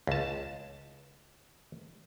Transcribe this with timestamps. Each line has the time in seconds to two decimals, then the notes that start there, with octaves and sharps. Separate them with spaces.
0.07 C#2 A5